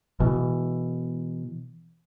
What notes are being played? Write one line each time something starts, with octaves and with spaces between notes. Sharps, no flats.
B2 E3